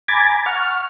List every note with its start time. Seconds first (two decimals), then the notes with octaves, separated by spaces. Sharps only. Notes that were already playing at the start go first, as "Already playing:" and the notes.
0.08 G#5 A#5 B5 D6 G#6 A6
0.46 F#5 C#6 F6